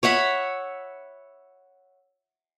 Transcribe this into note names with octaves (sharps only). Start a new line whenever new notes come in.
C#5 E5 F#5 B5